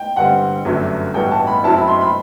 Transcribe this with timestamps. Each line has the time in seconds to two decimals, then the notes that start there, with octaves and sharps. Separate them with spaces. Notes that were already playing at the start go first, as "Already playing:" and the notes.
Already playing: G5
0.16 G2 D3 G3 C4 F#5
0.65 G1 F#2 F#3 A3 D4
1.14 A1 G2 E3 B3 F#4 G5
1.31 A5
1.47 B5
1.64 F#2 F#3 C4 E4 A5
1.76 B5
1.88 C6
2.01 B5